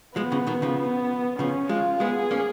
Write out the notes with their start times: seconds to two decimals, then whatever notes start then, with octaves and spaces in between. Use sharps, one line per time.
0.16 F3 G#3 B3
0.32 C#3 F3
0.47 B2 D#3
0.62 C#3 F3
0.78 B3
1.39 C#3 F3 C#4
1.69 F3 G#3 F4
2.00 G#3 B3 G#4
2.31 A#3 C#4